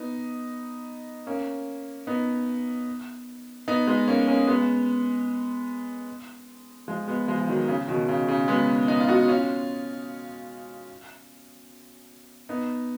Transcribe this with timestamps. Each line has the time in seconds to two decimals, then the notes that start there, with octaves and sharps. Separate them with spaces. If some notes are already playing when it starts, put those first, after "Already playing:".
Already playing: B3 D#4
1.27 A#3 C#4
2.07 B3 D#4
3.68 B3 D#4
3.87 G#3 B3
4.08 A#3 C#4
4.28 A#3 C#4
4.47 G#3 B3
6.88 F3 G#3
7.08 G#3 B3
7.28 F3 G#3
7.38 F3
7.48 D#3 F#3
7.68 C#3
7.88 B2 D#3
8.08 C#3
8.28 C#3
8.48 G#3 B3
8.88 B3 D#4
9.00 F4
9.09 D#4 F#4
9.28 C#4 F4
12.49 B3 D#4